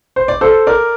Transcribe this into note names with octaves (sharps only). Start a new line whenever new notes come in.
C5
D5
A4 C5
A#4 D5